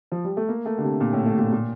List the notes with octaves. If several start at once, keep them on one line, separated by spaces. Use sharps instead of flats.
F3
G3
A3
A#3
A3
D3
C3
A#2
A2
A2
A#2
A#2